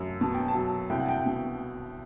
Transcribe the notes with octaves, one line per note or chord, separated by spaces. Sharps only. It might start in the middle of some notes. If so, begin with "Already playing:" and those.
Already playing: F#2
B2 A5
G5
A5
F#3
C2 G5
F#5
G5
B2